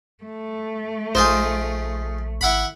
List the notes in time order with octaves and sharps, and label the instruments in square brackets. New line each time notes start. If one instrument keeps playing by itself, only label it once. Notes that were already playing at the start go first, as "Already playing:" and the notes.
[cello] A3
[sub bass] A#1 [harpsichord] D#4 F4 G#4 [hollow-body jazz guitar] C5
[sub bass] G#1 [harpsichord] E4 F#5 B5